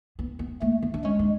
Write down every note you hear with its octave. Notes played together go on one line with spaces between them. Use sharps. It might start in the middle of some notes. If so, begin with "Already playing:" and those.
B3
B3
A3 A#3
B3
D4
G#3 C#4
D4